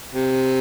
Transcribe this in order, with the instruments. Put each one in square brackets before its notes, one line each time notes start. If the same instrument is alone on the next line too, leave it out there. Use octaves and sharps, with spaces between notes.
[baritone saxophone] C3